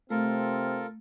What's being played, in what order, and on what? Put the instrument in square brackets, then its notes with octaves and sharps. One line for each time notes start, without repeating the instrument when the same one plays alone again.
[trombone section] C3 C4 [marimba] A3 [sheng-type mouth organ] F4 A4 A#4